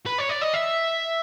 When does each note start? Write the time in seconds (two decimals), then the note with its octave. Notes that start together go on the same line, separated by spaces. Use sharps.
0.06 B4
0.18 C#5
0.29 D5
0.41 D#5
0.54 E5